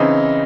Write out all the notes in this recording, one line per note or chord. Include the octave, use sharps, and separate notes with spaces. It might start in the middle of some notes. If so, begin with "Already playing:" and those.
Already playing: C#3 E3 C4 D#4